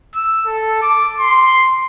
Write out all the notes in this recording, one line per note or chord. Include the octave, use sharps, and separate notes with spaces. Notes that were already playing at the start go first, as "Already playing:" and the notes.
E6
A4
D6
C6